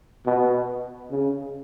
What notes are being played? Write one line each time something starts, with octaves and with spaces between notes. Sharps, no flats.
B2
C#3